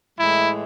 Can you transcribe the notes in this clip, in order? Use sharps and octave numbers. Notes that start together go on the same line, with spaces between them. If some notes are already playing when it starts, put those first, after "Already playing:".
A2 E3 G#3 E4